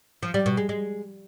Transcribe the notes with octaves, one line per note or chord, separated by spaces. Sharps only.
F3
G3
B2
G#3
G#3